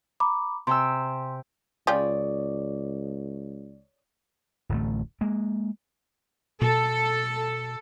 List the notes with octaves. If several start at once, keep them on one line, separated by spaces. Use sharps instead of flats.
A#5 B5 D6
C3 G5 G#5 C6 E6
C#2 C#3 F4 G4 C#5 D5 D#6
D1 A1 A3
G#3 A#3
B2 A4